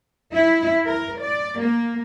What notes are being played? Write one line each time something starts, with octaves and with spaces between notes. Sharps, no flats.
E4
A#4
D5
A#3